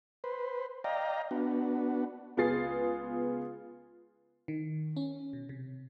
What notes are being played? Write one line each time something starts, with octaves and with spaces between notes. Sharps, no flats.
B4 C5
D5 D#5 F5 G5 A#5
B3 D4 F#4
C#2 B3 F4 G#4 A6 C7
D#3
C#4
B2
C3